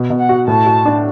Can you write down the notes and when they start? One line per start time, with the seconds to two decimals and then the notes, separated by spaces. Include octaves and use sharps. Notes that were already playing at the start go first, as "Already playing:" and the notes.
Already playing: B2
0.10 B2
0.19 F#5
0.29 F#4
0.48 A2 A5
0.66 F#4
0.85 D4